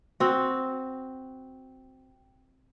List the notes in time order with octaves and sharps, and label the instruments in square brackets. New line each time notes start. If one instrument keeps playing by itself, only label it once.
[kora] C4 F#4